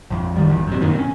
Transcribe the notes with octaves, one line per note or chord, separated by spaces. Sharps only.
A#1 F2
F#2 D#3 G3
G#1 E2
F#2 C3
F#2 A#2 D#3
C4 C#4